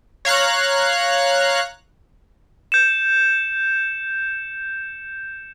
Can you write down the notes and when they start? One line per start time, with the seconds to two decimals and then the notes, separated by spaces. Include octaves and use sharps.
0.25 C#5 F5 A#5 F#6
2.72 G6 C#7 E7